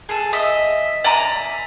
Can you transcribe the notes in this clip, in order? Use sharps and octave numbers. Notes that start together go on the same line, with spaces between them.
G#4 A4
D#5 E5
D5 E5 G#5 A#5